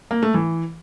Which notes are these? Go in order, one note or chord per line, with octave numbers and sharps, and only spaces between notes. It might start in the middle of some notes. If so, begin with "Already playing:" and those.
A#3
A3
E3